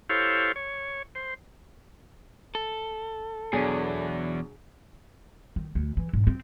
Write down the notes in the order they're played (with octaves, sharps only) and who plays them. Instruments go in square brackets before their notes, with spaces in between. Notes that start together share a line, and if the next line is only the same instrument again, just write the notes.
[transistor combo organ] E4 G4 A4 C5 C#5 F5
C#5
C5
[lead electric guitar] A4
[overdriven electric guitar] E2 [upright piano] B2 F#3 D4 [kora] G#4
[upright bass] D#3
D2
E3
G#2
C4